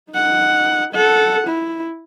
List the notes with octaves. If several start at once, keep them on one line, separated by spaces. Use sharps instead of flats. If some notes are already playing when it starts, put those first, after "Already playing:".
D#4 F#5
A4 F#5
E4